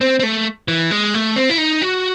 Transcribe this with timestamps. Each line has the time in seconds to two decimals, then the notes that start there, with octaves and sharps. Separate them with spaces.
0.01 C4
0.19 C4
0.23 A3
0.68 E3
0.91 G#3
1.14 A3
1.36 C4
1.50 E4
1.58 D#4
1.82 F#4